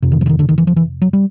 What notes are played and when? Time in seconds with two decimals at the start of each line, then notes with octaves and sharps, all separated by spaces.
0.02 F2 C3
0.12 D#3
0.21 F3
0.26 D3
0.29 D#3
0.39 D3
0.49 D#3
0.58 E3
0.67 F3
0.76 E3
1.02 F#3
1.13 G3